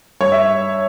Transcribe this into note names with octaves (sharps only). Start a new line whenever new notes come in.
G2 C#5
E5